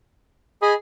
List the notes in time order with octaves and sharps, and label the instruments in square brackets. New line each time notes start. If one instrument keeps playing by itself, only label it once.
[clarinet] G#4 [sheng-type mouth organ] D#5 G#5 B5